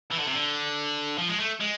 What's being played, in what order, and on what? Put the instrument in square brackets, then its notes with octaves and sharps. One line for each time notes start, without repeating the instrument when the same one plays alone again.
[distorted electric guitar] E3
D3
C3
D3
F3
G#3
A3
G#3